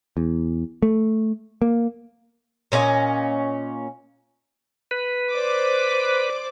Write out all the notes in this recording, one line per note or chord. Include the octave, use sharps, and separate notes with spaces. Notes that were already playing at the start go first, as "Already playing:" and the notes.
E2
A3
A#3
A#2 C#4 G4 D#5
B4
C5 D5 D6